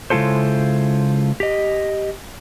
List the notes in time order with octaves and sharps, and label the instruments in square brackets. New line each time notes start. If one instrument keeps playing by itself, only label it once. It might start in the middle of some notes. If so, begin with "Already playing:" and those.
[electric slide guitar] C#3 G#3 E4 F4 A4 C5
G4 D#5